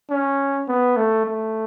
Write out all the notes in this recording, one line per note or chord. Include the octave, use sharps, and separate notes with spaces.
C#4
B3
A3
A3